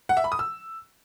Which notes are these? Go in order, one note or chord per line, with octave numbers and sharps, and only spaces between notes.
F#5
E5
B5
D#6
E6